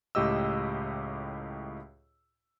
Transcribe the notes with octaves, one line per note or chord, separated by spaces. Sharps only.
C#2 A2 G4 D#5 E6